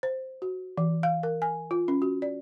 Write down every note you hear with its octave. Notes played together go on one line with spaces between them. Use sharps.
C5
F#4
E3
F5
A#4
G#5
F4
C#4
F#4
D5